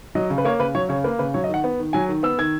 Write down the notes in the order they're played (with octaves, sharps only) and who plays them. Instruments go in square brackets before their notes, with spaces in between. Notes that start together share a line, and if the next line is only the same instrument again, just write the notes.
[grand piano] F#3 D#5
C#3
B4
A#3 C#5
C#3 B4
F#3 C#5
C#3 C#5
A#3 B4
C#3 B4
F#3 C#5
D#5
D#3 F#5
B3
D#3
F#3 G#5
D#3
B3 E6
D#3 G#6